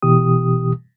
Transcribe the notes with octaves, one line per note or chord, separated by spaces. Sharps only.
B2 E3 G4 D#6